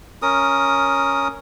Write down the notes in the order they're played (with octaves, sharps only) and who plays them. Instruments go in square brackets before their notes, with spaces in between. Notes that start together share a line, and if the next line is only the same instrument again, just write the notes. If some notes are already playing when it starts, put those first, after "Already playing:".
[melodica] C#4 A#4 D#6